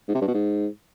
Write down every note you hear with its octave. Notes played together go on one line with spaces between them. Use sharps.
G#2
C3
G2
B2
G#2